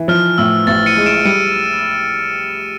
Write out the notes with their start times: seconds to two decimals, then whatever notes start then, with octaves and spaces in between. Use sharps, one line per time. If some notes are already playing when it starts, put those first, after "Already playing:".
Already playing: E3
0.08 F3 F6
0.38 A2 E6
0.67 A1 A6
0.86 C#7 D#7
0.97 G#3
1.06 D7 E7
1.25 G3 C#7 D#7